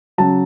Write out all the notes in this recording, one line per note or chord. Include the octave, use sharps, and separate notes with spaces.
C#3 F#3 A5